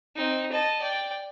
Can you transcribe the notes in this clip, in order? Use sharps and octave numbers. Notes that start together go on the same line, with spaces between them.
C4 D#4
D#5 A5
D5 G5